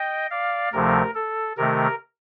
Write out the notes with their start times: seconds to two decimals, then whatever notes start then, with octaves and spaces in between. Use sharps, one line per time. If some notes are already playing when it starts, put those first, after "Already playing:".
Already playing: D#5 G5
0.30 D5 F5
0.72 D2 C3 F3 A3 A#4
1.15 A4
1.57 C3 D#3 A3 A#4